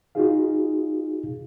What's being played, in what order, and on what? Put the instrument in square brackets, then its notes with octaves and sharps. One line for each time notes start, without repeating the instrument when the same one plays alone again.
[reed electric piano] D#4 F4 F#4 G#4 F5